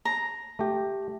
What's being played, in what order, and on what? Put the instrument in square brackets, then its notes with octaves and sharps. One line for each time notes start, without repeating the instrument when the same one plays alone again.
[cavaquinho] A#5
[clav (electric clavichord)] A3 G4